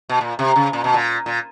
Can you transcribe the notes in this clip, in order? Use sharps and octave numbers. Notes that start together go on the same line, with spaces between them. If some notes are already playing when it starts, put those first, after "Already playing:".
B2
A#2
C3
C#3
A#2
B2
A#2
A#2